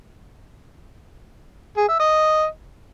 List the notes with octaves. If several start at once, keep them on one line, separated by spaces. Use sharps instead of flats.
G#4
E5
D#5